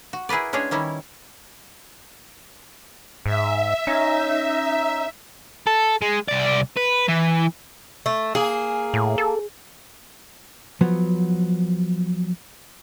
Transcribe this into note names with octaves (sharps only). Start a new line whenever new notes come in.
F#4
E4 G#4 A#4 B4 D5
G#3 C#4 D4 G#4 C#5
D#3 G3 C#4 E4
G#2 E5
C#4 D#4
A4
G#3
C2 D5
B4
E3
A3
A#3 G#4
A2
A4
F3 F#3 B3